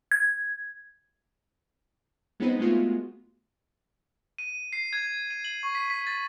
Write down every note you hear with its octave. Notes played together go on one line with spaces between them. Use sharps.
G#6
G#3 B3 C4 D#4 B4 C5
G#3 A3 B3 F4 F#4
D#7
C7
G#6
D#7
F#7
C#6
B6
B6
A6